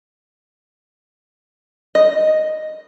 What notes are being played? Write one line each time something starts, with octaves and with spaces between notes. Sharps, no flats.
D#5